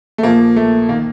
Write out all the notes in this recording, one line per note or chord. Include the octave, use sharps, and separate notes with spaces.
A3
A#1 A#2 F3 A#3
A3
D#3 A#3